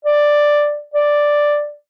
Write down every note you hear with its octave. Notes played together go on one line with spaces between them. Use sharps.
D5
D5